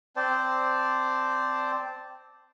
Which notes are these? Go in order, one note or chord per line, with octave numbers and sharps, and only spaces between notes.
C4 C5 D5 A5